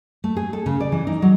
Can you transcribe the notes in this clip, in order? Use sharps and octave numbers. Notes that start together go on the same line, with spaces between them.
A3
G#4
A4
C#3
D5
E3
D#4
F#3